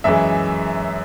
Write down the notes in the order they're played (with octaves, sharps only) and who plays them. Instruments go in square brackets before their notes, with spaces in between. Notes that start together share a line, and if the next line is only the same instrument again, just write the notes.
[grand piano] F#2 E3 G#3 E5